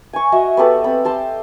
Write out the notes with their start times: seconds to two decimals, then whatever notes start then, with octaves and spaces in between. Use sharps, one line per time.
0.13 G#5 C#6
0.32 F#4 D#5 E5
0.57 B3 G4 A4 B4
0.84 C4 B5
1.05 G4 A5 C6